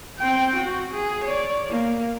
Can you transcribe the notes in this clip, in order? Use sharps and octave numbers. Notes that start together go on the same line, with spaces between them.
C4 G5
F#4
G#4
C#5 D5
A#3